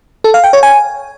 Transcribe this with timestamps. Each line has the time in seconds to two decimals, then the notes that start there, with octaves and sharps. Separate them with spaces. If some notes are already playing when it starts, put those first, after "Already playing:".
0.24 A4
0.34 F5
0.44 G5
0.53 C#5
0.63 G#5